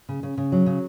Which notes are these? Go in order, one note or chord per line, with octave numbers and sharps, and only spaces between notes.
C#3
C#3
C#3
F#3
C#3